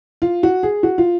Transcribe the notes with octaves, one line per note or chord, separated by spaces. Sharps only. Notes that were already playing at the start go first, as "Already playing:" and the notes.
F4
F#4
G#4
F#4
F4